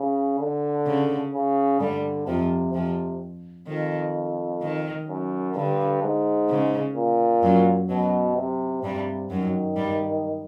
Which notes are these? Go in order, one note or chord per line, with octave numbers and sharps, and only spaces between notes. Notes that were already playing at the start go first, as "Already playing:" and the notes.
Already playing: C#3
D3
C#3
C#3
G2 D3 G3
F2 C3 F3
F2 C3 F3
F2 D#3
D#3
F#2
G2 D3
G#2
C#3
A#2
F#2 F#3
F#2 B2 F#3
C3
G2 C3 G3
F#2 D#3 F#3
G2 G3